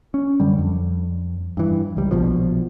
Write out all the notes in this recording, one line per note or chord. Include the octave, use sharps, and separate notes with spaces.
C#4
F#2 D3 G3
F2
G2 E3
C#2 G3
A#1 B2 F3